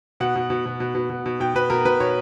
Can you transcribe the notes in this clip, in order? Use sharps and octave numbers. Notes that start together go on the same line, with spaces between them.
B2 F#5
B2
B2
B2
B2
B2
B2
B2
B2 G5
B2 B4
B2 A#4
B2 B4
B2 C#5